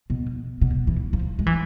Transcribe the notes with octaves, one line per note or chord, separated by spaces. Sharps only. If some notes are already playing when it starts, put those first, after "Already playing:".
B2
B2
E3
F3
G#3
E3